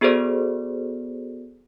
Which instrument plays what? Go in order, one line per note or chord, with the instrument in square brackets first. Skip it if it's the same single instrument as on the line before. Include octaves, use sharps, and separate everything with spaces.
[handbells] B3 F#4 G#4 A4 C5 D5